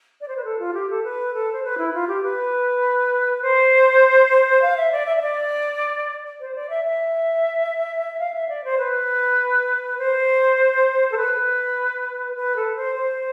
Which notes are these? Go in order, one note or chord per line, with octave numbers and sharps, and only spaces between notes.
D5
C5
B4
A4
F4
G4
A4
B4
A4
C5
B4
E4
F4
G4
B4
C5
F5
E5
D5
E5
E5
D5
C5
D5
E5
E5
F5
E5
D5
C5
B4
C5
A4
B4
B4
A4
C5
C5